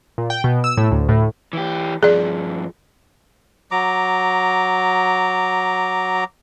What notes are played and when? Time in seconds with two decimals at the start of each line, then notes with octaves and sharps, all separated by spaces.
0.18 A#2
0.30 G5
0.44 B2
0.64 E6
0.77 A2
0.91 D2
1.09 A2
1.53 E3 G4
2.03 G2 F3 G#4 D5
3.71 F#3 A#5 D6